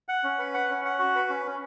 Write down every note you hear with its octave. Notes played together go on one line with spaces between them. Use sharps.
F#5
C#4
B4
F#5
C#4
F#5
F#4
B4
C#4
C#4